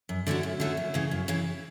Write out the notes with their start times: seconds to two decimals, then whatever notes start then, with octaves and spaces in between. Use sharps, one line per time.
0.09 F#2
0.27 D3 A3 C#4 F#4
0.43 F#2
0.60 D3 A3 C#4 F#4
0.77 F#2
0.94 C#3 E3
1.11 F#2
1.28 C#3 E3